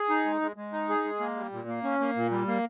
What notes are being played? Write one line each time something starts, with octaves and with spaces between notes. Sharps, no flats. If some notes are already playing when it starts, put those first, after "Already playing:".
Already playing: G#4
D#4
G#3
G#3
G#3
D#4
G#4
G#3
A#3
G3
A#2
A#3
C#4
A#3
A#2
G3
A#3